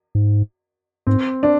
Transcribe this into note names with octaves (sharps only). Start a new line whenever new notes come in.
G#2
G#2 C4
D4